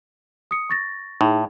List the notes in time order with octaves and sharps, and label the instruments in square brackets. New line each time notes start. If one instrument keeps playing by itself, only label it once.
[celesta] D#6 C#7
C#6 A6 A#6
[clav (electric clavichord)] A2 [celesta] D#4 G#4